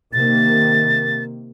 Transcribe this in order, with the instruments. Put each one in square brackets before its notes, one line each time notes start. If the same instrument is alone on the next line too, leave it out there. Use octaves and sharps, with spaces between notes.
[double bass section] C3 D#3 A#3 [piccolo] A6